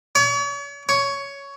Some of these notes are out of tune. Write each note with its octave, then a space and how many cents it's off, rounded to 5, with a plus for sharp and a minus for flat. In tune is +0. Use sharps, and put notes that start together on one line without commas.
C#5 +40
C#5 +10